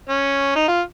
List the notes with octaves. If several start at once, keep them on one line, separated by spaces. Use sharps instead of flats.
C#4
D#4
F4